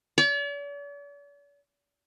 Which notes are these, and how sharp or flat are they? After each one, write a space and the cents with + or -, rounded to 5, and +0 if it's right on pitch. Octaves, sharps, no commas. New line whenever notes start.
D5 -45